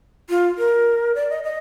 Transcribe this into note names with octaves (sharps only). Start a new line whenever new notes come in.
F4
A#4
D5
D#5
D#5